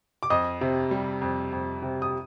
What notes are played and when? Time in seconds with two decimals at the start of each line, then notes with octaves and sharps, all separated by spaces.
0.23 D6
0.30 F2 D#5 D#6
0.61 C3
0.91 G3
1.21 F2
1.53 F2
1.82 C3
2.02 D#6